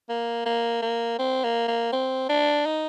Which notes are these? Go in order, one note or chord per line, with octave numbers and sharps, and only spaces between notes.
A#3
A#3
A#3
C4
A#3
A#3
C4
D4
D#4